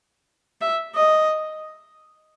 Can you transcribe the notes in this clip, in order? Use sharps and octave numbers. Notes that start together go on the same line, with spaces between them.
E5
D#5